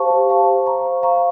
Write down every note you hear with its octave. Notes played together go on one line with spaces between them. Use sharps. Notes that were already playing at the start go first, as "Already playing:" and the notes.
Already playing: G4 C5 F5 A5 C#6
G4
C5 F5 A5 C#6
C5
F5 A#5 C#6
C5
F5 A#5 C#6